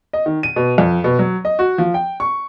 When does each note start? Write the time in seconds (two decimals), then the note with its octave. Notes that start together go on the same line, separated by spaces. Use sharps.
0.13 D#5
0.26 D#3
0.43 D#7
0.56 B2
0.78 F2
1.04 B2
1.19 F#3
1.45 D#5
1.59 F#4
1.78 F3
1.94 G5
2.20 C#6